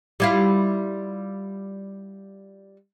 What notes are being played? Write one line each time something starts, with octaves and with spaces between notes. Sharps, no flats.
G3 E4 F4